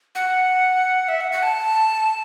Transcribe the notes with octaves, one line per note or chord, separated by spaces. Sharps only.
F#5
E5
F#5
F#5
A5